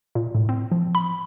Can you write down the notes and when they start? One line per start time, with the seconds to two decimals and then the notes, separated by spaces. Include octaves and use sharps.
0.15 A#2
0.35 A2
0.49 C4
0.72 F3
0.95 B5